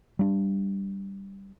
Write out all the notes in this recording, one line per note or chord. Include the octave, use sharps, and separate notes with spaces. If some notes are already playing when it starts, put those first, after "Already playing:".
G3 D4